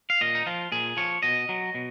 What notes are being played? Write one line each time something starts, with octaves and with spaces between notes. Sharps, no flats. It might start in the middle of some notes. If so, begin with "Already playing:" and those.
F5
A#2 D#5
D#4
F3 F4
A#2 G#4
F3 C#5
B2 D#5
F#3
B2